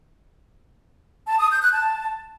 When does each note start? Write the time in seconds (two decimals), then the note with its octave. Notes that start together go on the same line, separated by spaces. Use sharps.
1.27 A5
1.39 D#6
1.50 G6
1.62 F#6
1.73 A5